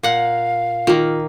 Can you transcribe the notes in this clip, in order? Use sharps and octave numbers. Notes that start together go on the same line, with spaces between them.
A#2 F5 F#5
D#3 A#3 F4